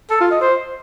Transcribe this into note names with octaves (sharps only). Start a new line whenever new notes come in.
A4
F4
D#5
C5